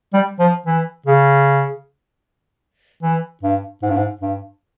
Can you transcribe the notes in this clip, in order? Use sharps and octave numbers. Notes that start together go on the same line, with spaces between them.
G3
F3
E3
C#3
E3
G2
G#2
G2
G#2
G2